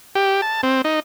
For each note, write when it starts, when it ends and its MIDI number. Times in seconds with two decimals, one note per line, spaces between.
0.15 0.41 67
0.42 0.61 81
0.63 0.82 60
0.85 1.00 63